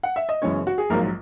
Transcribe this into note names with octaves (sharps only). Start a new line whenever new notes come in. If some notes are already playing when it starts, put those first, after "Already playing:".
F#5
E5
D#5
F#1 F#2 E3 G#3 B3 C#4 C#5
F#4
G#4
A#1 G#2 F#3 A#3 A#4